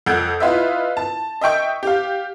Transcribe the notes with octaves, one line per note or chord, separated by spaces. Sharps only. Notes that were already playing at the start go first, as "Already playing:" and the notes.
F2 F#5 E6 G6 G#6 D7
E4 F4 B4 D#5 E5
A5
D#5 E5 G5 C#6
G4 F5